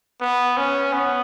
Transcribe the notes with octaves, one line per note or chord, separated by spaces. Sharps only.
B3
C#4
B3